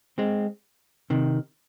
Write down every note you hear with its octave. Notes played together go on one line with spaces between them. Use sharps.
G#3 C4
C3 D#3